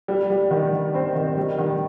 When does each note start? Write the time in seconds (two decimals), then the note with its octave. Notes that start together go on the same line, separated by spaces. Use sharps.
0.08 G3
0.30 G3
0.51 D#3
0.73 D#3
0.94 C4
1.15 D#3
1.37 G3
1.58 D#3